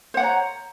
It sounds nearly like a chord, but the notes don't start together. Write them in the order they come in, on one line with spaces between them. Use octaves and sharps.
C5 F#5 C#5 A#5